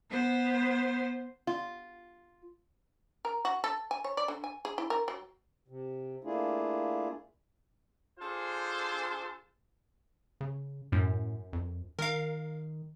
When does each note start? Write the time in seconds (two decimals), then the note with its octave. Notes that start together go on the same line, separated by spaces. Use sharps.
0.10 B3 C5
1.47 F4
3.25 A#4
3.45 F#4
3.64 A4
3.91 G#5
4.04 C#5
4.17 D5
4.28 D3
4.44 G#5
4.65 G#4
4.78 E4
4.90 A#4
5.08 F#3
5.68 C3
6.24 A3 A#3 D4 E4 F4 G#4
8.19 D4 F4 G#4 A4 C5
10.41 C#3
10.92 F#2 A2
11.53 F2
11.99 D#3 A#4 F5